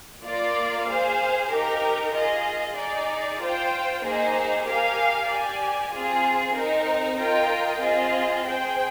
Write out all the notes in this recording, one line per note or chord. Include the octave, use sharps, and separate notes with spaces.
A#3 F4 A#4 D5
G#4 C5 F5
D#4 G4 A#4
F4 G#4 D#5
D#4 G#4 D5
F4 C5 G5
A#3 D#4 G#4 C5
G4 A#4 F5 G#5
G4 D5 G#5
C4 F4 G#4
C4 D#4 A#4
F4 A#4 D#5 G5
C4 F4 G#4 D#5
G#4 C5 G5